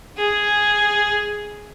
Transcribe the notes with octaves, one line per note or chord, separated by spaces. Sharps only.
G#4